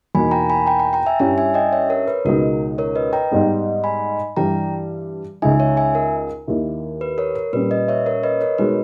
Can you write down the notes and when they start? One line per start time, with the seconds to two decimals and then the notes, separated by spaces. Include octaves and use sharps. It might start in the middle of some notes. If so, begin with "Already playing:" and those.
0.15 E2 B2 A#3 D#4 G#5 B5
0.31 G5 A#5
0.50 G#5 B5
0.67 G5 A#5
0.80 G5 A#5
0.93 G5 A#5
1.06 E5 G#5
1.20 G2 G3 C#4 E4 C#5 E5
1.38 E5 G#5
1.54 D#5 G5
1.73 C#5 E5
1.90 A#4 C#5
2.08 B4
2.25 C#2 B2 G#3 D#4 A#4
2.78 A#4 C#5
2.95 B4 D#5
3.13 G5 A#5
3.31 G#2 G3 B3 D#4
3.84 G#5 B5
4.36 G2 E3 G3 G5 A#5
5.42 C#2 C#3 G#3 D#4 E5 G#5
5.60 C#5 E5
5.77 E5 G#5
5.95 A#4
6.47 D#2 D#3 A#3 E4
7.01 B4
7.18 A#4 C#5
7.35 A#4
7.53 A#2 G3 C#4 B4
7.71 B4 D#5
7.88 C#5 E5
8.06 A#4 C#5
8.23 B4 D#5
8.41 A#4 C#5
8.58 B2 G#3 D#4 B4